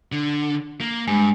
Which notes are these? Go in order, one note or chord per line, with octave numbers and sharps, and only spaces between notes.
D3
A#3
G2 G#3